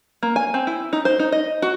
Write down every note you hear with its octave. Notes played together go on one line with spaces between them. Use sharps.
A#3
G#5
C4
E4
D#4
C5
D#4
D#5
F#4